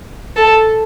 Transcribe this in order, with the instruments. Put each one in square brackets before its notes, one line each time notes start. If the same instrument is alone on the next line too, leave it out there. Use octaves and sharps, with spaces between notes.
[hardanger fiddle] A4